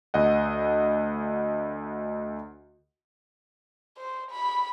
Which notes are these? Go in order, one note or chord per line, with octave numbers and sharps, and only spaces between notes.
D2 D#5 F#5
C5
B5